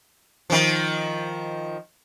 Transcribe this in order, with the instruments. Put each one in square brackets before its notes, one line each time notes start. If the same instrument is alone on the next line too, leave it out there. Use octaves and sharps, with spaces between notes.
[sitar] D#3 F3